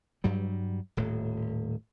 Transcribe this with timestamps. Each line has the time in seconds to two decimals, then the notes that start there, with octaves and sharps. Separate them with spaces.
0.24 G2 F#3 G3
0.97 D#1 A2